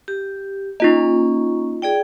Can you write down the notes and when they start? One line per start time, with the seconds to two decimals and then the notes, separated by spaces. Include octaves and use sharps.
0.08 G4
0.80 A#3 C#4 D#4 F4 D#5
1.82 G#4 D5 G5